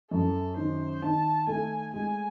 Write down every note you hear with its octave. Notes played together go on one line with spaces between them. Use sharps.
F#2 A4
D#3 C5
D#3 A5
A3 G#5
G#3 G#5